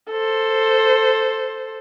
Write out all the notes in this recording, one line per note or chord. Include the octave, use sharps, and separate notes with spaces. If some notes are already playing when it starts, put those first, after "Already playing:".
A4 C5